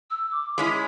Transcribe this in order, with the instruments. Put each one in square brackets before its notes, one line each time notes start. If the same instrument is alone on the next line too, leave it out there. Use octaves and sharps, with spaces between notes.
[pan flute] E6
D6
[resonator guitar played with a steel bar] G#3 C#4 E4